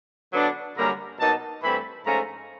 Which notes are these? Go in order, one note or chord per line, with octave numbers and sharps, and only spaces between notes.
D3 F#3 B3 D4
F#2 D3 G3 A#3 C#4 A#5
B2 F#3 A#3 D#4 A5
G2 E3 A3 C4 B5
G#2 F3 A3 C#4 A#5